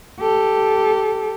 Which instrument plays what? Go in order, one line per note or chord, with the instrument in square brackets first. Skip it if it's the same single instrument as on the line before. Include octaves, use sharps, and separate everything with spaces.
[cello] G4 A4